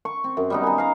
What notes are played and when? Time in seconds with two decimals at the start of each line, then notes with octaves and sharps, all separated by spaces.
0.05 C#6
0.24 C4
0.37 F#2
0.50 G3 B3 D#4
0.63 G#5 A#5
0.78 F5 A#5